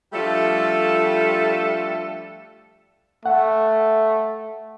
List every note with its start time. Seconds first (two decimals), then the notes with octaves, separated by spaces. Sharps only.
0.13 F3 G3 A3 D4 F4 A4
3.26 A3 F#5